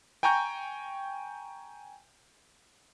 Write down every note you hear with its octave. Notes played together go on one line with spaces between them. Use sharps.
G5 G#5 A#5 C#6 G6